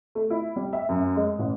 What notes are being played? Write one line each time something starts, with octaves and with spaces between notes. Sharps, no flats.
A3
E4
G3
E5
F#2
G#3
A1